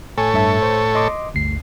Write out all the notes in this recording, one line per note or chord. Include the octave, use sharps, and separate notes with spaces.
A2 A4 C#5 G#5
G2 E5 A5
C5
D#5 C6 D6
G1 D2 C7